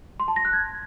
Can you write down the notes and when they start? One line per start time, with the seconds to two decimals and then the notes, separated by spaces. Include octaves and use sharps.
0.20 C6
0.28 A5
0.36 A#6
0.45 F#6
0.53 G#6